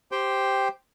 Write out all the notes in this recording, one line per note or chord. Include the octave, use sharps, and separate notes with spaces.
G4 C5 G5